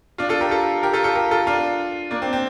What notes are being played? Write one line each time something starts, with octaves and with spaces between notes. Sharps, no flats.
D4 F4
F4 A4
G4 A#4
F4 A4
G4 A#4
F4 A4
F4 A4
G4 A#4
F4 A4
D4 F4
A#3 D4
C4
C4